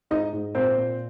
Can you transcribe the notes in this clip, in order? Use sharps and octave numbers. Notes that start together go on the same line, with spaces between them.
G#2 D#4 D#5
G#2
A#2 C4 C5
A#2